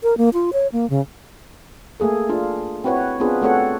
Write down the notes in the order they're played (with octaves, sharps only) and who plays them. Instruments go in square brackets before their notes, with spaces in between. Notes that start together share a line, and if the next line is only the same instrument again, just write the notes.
[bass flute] A#4
A#3
F4
C#5
A#3
C#3
[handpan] A3 A#3 G#4 A4
D4 F4
C4 E4 F#4 B4 C#5
B3 C4 D4 F4 G#4 B4
A3 C4 F#4 A4 C#5 F#5